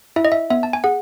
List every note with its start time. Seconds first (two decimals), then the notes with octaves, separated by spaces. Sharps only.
0.16 E4 E5
0.25 D#5
0.32 E5
0.50 B3 E5
0.63 A5
0.73 G#5
0.84 G#4 F#5